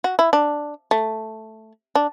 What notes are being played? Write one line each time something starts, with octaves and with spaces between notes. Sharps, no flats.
F#4
E4
D4
A3
D4